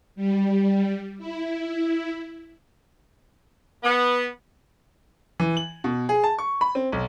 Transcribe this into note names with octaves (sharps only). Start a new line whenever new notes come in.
G3
E4
B3
E3
F#7
B2
G#4
A5
C#6
B5
C4
B1